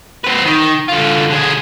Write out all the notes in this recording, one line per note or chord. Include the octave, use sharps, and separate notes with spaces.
C4 B4
D#3
D3 F4
D3 G#4